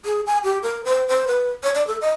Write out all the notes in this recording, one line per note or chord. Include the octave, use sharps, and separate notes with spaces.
G#4
G#5
G4
A#4
C5
C5
B4
C#5
D5
A4
D#5